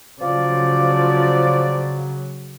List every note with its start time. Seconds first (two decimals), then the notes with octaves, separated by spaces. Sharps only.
0.21 C#3 F3 F#3 D5